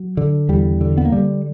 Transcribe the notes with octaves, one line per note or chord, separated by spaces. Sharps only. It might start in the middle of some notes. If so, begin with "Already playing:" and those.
Already playing: F#3
D3
E2 G3
D3
B3
A#3
D3 G3